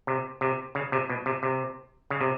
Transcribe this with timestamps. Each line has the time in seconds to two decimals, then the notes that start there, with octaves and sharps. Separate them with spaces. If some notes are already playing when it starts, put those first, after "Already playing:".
0.07 C3
0.41 C3
0.75 C#3
0.92 C3
1.10 B2
1.26 C3
1.43 C3
2.10 C#3
2.21 C3